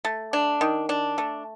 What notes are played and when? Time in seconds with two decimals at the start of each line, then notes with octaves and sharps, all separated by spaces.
0.05 A3
0.33 D4
0.61 D#3
0.89 D4
1.18 A3